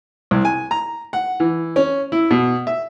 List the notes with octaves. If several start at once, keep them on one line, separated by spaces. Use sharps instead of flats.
C2
G#5
A#5
F#5
E3
C#4
E4
B2
E5